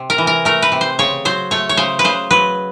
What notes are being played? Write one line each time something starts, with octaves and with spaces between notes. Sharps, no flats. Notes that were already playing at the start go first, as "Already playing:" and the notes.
Already playing: C3
A#4
E3
A#4
A3 A#4
B4
C3
C5
C#3 C#5
F#3 C5
A3 C#5
C#5
C#3 C5
B4
C#3 C5
F#3 B4